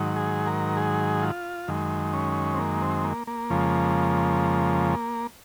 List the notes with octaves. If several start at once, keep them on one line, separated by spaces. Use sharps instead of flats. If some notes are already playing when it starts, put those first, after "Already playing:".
Already playing: G#2 D#3 F#3
G#4
A#4
G#4
F4
F#2 D#3 G#3
C#4
C4
A#3
C4
A#3
A#3
F2 C#3 F3 G#3